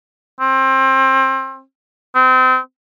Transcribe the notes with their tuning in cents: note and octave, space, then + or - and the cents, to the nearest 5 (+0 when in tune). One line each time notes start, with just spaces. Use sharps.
C4 +25
C4 -30